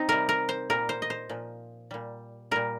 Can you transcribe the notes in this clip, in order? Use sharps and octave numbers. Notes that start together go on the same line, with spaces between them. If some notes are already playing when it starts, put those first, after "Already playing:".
Already playing: C4 D#4
C3 G3 A#4
A#4
C5
A#2 G3 A#4
C5
D#5
C5
A#2 F3
A#2 G3
A#2 G3 A#4